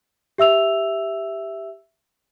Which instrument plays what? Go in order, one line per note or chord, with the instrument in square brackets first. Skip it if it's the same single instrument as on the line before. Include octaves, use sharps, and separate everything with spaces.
[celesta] G4 E5 E6 F7